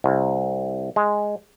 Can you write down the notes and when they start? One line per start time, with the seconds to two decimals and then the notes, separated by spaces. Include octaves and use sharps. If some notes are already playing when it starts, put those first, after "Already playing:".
0.04 C2
0.96 G#3